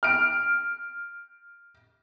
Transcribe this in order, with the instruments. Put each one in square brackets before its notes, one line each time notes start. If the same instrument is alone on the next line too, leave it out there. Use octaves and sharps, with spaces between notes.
[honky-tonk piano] F6 D7